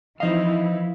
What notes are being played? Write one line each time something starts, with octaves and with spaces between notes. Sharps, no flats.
E3 F3 C4 D#4 E4 D#5 F5